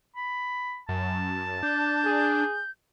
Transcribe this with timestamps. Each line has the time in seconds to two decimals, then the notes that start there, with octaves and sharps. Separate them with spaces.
0.16 B5
0.89 F#2 A5
1.63 D4 G6
2.05 G#4